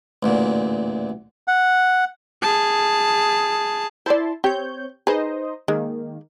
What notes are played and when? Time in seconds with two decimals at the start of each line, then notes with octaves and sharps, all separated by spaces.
0.23 A1 D2 A#2
1.48 F#5
2.42 G#4 A5
4.06 E4 C5 D5 A5 C6
4.44 C4 G4 C#5 G6
5.07 D#4 G#4 B4 C5 D#5
5.68 D#3 G#3 A#3